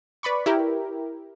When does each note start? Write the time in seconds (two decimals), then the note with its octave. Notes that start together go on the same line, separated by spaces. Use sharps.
0.23 B4 D5 B5 C#6
0.46 E4 G4 A#4